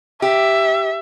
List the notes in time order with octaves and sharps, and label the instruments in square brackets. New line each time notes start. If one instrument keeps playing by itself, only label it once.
[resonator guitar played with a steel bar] G4 [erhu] E5